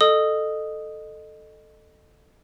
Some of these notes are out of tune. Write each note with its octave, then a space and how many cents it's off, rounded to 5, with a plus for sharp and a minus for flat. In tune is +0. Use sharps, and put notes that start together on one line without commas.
A4 +0 D#5 -25 D#6 +0